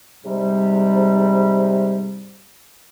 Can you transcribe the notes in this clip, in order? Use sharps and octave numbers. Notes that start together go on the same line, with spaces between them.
G#2 C3 G3